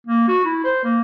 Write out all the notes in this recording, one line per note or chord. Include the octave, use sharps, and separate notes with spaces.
A#3
F#4
E4
C5
A#3